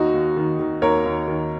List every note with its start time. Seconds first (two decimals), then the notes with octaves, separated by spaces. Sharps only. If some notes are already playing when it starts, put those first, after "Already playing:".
Already playing: D#2 D#4 F#4
0.14 D#2
0.37 D#3
0.59 D#3
0.82 D#2 A#4 C#5
1.05 D#2
1.28 D#3